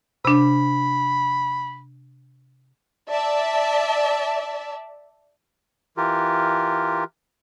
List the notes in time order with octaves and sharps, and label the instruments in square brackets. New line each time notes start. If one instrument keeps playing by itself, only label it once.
[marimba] C3 D4 [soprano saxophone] B5
[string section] D5 E5 A5
[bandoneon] E3 F4 G4 A#4